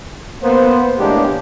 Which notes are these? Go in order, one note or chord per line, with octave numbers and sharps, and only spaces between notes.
A#3 B3 C5
E2 A2 G#3 A#3 D4 G4